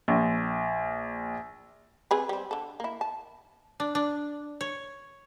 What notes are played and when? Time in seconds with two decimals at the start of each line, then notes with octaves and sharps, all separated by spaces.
0.08 A#1
2.11 C4 G#4 B4
2.29 G3 C4
2.51 D3 A4
2.80 A#3 E4
3.01 A5
3.80 D4
3.95 D4
4.61 C#5